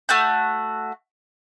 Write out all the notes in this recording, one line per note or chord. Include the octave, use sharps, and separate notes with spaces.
A3 F#4 G6